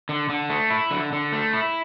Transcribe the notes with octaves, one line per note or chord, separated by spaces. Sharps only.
D3
D3
A3
E4
D3
D3
A3
E4